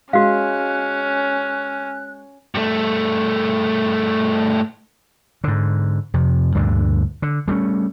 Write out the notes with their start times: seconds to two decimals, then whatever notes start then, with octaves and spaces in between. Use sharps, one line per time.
0.13 G#3 C#4 F#4 F5 F#6
2.55 G2 A3
5.44 G#2 D3
6.14 F2 C3
6.55 D2 G2 A#2 D3
7.22 D3
7.48 G3 A3 C4 C#4